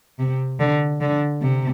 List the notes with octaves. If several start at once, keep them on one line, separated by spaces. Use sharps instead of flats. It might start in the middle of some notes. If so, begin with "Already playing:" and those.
C3
D3
D3
C3